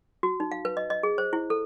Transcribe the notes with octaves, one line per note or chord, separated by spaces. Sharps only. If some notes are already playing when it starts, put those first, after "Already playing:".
F#4
D#4
F5
B4
D#5
D#5
G#4
C5
E4
A4